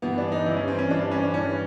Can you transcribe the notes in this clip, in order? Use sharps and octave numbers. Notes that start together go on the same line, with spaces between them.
G2 E3 B3
D4
D4
D#4
G2 E3 E4
C#4
C4
C#4
G2 E3 D4
D4
C#4
D4
G2 E3 C#4